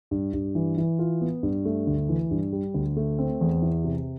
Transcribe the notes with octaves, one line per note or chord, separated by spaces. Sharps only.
G2
G2
E3
E3
F4
B3
G2
A3
D2
E3
G2
G3
D2
A3
C4
E2
E3
C3